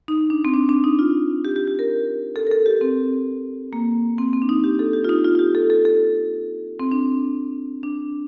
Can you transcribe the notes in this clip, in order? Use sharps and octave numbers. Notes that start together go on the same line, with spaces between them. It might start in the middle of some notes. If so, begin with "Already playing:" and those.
D#4
D4
C4
D4
D4
D#4
F4
G4
G4
G4
A#4
A4
A#4
A4
G4
C4
A#3
C4
C4
D4
D#4
G4
A4
G4
F4
D#4
F4
F4
G4
A4
A4
A4
C4
D4
D4